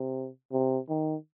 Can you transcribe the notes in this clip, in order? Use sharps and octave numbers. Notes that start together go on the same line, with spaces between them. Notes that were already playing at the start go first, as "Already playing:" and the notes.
Already playing: C3
C3
D#3